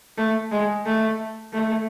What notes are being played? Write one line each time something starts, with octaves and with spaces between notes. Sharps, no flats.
A3
G#3
A3
A3